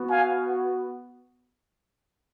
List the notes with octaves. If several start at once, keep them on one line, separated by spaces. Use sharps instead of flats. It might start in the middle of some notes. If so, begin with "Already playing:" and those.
Already playing: B3 F#4
F5 G#5